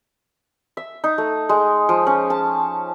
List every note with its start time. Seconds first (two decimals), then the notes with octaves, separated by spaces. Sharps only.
0.77 E5
1.04 D#4
1.18 A3
1.49 G#3
1.89 F3
2.07 C#4
2.30 A5